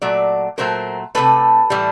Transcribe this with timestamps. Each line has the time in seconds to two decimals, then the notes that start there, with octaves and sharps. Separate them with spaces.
0.02 A#2 F#3 A3 D5
0.58 A#2 F#3 A3 A#4 C5
1.15 C3 E3 A3 A4 B4
1.70 A2 E3 G3